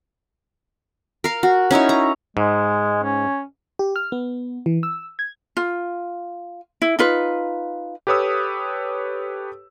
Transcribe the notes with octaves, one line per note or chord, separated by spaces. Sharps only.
A#4 F5
F#4
C#4 D#4 E4 C#5
A#5
G#2 G#3
C#4
G4
F6
B3
E3
E6
G#6
F4
E4
D#4 F4 B4
G4 A4 B4 C#5 D#6 E6